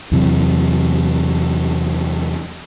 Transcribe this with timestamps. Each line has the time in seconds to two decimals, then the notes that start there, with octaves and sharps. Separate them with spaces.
0.12 E2 C3 F#3